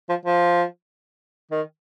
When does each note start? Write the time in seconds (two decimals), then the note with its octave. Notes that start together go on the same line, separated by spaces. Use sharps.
0.09 F3
0.25 F3
1.51 D#3